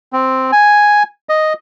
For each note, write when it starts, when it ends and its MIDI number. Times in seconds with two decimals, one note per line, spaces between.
0.13 0.51 60
0.52 1.03 80
1.29 1.53 75